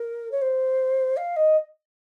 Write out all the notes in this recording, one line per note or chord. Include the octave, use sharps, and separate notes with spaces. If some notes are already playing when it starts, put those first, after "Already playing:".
Already playing: A#4
C#5
C5
F5
D#5